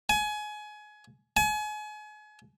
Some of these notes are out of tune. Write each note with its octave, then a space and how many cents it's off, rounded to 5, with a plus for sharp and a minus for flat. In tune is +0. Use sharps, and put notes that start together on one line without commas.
G#5 +25
G#5 +35